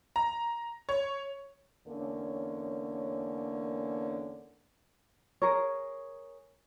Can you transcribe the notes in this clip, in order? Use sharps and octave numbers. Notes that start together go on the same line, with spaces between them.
A#5
C#5
E2 D3 A#3 C#4 C#5
G#4 A#4 C#5